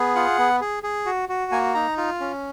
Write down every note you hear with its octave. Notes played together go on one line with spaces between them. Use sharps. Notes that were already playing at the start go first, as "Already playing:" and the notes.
Already playing: B3 G#4
F4 F#5
B3
G#4
G#4
F#4
F#4
A#3 G#5
D#4 A#5
F4
C#4